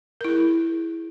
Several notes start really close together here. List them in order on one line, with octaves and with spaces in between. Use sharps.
A#4 E4 G#4